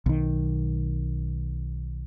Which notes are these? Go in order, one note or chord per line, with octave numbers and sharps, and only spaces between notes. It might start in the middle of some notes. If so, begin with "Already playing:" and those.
B1 D#3